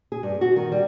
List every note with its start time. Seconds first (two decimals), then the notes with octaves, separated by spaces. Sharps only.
0.12 G#4
0.23 G2
0.41 F#4
0.56 D#3
0.72 G3